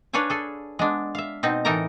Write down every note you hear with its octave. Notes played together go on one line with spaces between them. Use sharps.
D4 B4 C#5 F5 G#5
G#4 A4 G#5
G#3 B3 D4
E5 F5
B2 C4 D#4
A2 E3 D#4 A4 A#4 A#5